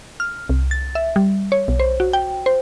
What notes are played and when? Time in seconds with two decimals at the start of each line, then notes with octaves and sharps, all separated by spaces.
0.20 F6
0.49 C2
0.71 A6
0.95 E5
1.16 G3
1.52 C#5
1.68 B1
1.80 C5
2.00 F#4
2.13 G5
2.46 C5